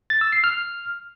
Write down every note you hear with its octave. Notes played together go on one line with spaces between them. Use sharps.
A6
E6
C7
F6